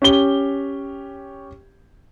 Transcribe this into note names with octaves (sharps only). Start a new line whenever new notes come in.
C#4 G4 G7